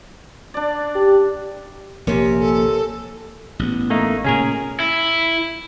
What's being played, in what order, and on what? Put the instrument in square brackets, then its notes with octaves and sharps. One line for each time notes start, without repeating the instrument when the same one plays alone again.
[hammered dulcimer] D4 D5
[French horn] G4
[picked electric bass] A#1 A#3 [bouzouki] C3 C#4
[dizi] A4
[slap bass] A1 B3
[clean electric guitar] A3 A#3 D#4
[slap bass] A#2 C#3 [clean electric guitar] C#4 G#4 A#4
[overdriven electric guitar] E4